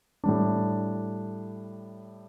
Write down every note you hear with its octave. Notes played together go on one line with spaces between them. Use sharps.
A2 G3 D4